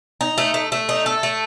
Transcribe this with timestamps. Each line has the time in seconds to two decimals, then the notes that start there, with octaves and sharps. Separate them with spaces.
0.21 D#4
0.38 A3
0.54 A3
0.72 A3
0.89 D#4
1.06 A4
1.23 A3